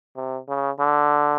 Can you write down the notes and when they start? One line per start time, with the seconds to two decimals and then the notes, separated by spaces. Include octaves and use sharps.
0.16 C3
0.49 C#3
0.80 D3